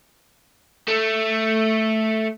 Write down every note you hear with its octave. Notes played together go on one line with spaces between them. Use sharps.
A3